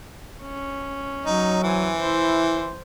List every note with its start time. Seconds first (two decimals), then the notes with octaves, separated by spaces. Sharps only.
0.42 C#4
1.26 F#3 D#4
1.63 E3 C5 G#5
1.99 E4 C5